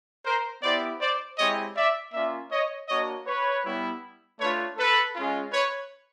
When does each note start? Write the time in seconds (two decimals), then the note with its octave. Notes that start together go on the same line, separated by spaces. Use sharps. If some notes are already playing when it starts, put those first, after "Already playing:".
0.25 A#4 C5
0.63 B3 E4 G4 C5 D5
1.00 C5 D5
1.38 G#3 C4 E4 G4 C#5 D#5
1.76 D5 E5
2.13 A#3 C#4 F4 D5 E5
2.52 C#5 D#5
2.89 A#3 D4 F#4 C#5 D#5
3.27 B4 C#5
3.65 G3 B3 E4
4.40 A3 D4 F4 B4 C#5
4.78 A4 B4
5.15 G#3 C#4 F4
5.53 B4 C#5